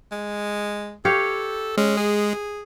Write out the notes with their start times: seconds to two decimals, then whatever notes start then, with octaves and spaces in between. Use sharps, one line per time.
0.12 G#3
1.05 G4 A4 C#5 F5
1.78 G#3 C#4
1.97 G#4